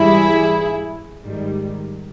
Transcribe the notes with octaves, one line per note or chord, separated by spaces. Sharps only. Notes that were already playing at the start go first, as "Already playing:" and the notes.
Already playing: G#2 E3 G3 E4 G#4
G#2 D#3 G3